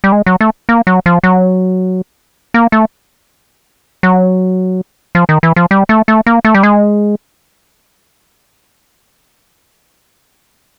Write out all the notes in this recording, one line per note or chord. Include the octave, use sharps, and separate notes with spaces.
G3
G#3
F#3
A3
A#3
F#3
F3
F#3
A#3
A3
F#3
F3
D#3
E3
F3
G3
A3
A3
A#3
A3
G3
G#3